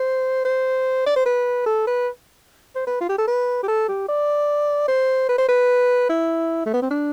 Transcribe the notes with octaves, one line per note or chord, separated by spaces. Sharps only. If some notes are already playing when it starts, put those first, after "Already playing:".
Already playing: C5
C5
D5
C5
B4
A4
B4
C5
B4
F4
G4
A4
B4
G4
A4
G4
D5
C5
B4
C5
B4
E4
A3
B3
C4
D4